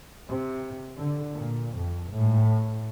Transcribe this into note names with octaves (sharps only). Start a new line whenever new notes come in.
C3
D3
A#2
F2
A2